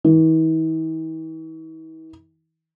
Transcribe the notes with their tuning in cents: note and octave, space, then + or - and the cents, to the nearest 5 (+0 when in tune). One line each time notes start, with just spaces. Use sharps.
E3 -45